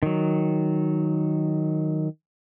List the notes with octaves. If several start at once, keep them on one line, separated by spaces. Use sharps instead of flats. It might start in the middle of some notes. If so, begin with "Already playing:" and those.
D#3 F#3